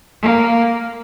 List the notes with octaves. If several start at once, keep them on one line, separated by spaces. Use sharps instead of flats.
A#3